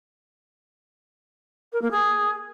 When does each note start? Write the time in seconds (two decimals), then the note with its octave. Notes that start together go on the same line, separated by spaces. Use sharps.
1.72 A#4
1.82 A#3
1.91 G#4